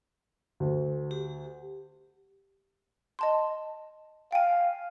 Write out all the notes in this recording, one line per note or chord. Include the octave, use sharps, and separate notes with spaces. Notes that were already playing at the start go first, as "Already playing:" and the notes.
D2
G4
D#5 A5 C6
F5 G5 G#5